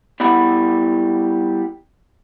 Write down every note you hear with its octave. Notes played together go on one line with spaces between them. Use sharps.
G3 B3 E4 F#5 B5